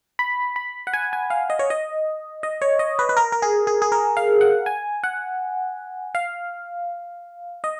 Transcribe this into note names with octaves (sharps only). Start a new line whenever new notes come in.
B5
B5
F#5
G#5
G#5
F5
D#5
C#5
D#5
D#5
C#5
D#5
B4
B4
A#4
A#4
G#4
G#4
G#4
A#4
F5
F#5
G#5
F#5
F5
D#5